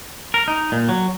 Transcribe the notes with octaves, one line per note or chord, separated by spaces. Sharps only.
A#4
D#4
A#2
F#3